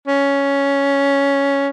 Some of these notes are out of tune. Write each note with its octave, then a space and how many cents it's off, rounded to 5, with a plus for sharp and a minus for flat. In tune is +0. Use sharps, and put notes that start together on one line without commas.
C#4 +5